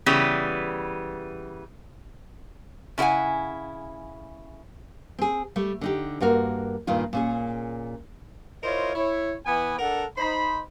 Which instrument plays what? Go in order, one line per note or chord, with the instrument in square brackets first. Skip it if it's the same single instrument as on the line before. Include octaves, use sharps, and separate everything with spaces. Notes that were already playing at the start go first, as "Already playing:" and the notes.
[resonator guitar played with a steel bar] C#3 E3 G3 B3
C#3 E4 A4 F#5 G#5
[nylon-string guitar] C4 G#4
G3 A3
D3 D#4 G4
G2 A#3 F#4 A#4
G2 A#2 D#3 F4
A#2 C#4 G#4
[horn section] E4 F4 A#4 C5 C#5 D#5
E4 C#5
E3 B3 G#5
D4 A4 A#4 F#5
D#4 C5 B5